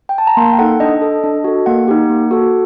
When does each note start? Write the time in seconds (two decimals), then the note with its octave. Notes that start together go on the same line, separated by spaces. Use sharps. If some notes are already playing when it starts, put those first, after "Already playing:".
0.09 G5
0.18 A5
0.27 A#5
0.37 A#3 C6
0.53 G5
0.59 D#4 A4 F#5
0.80 D4 D#5
1.01 A4
1.24 D4
1.44 F#4 A4
1.66 A#3 F#5
1.88 D#4 G4
2.09 A#3
2.31 F#4 A4